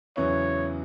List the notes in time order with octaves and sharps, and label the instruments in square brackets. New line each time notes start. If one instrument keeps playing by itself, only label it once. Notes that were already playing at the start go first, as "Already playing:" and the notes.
[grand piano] E2 C#3 F#3 B3 E4 [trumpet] C#5